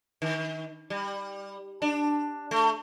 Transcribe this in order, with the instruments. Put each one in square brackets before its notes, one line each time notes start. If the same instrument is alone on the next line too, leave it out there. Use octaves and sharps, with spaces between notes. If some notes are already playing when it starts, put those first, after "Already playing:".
[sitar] D#3
G3
D4
A3